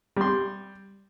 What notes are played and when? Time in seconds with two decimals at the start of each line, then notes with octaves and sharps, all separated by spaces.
0.17 G3 C6